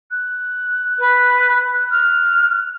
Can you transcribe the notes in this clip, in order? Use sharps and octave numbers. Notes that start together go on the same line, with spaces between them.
F#6
B4
F6